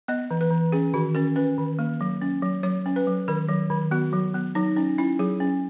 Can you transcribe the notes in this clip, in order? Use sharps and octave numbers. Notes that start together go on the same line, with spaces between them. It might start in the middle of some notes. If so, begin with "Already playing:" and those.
B3 D#5
E3
B4
E3
C#4 G#4
D#3 F#4
C#4 A#4
C#4 B4
D#3
A#3
F#3
C#4
F#3
F#3 C#5
C#4
B4
F#3
D#3 A#4
F#3
D#3
B3 F#4
F#3
B3
F#3 D#4
C#4 D#4
C#4 E4
F#3 G#4
C#4